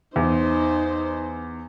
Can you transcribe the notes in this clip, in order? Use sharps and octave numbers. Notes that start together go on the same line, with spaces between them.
E2 D#4 C5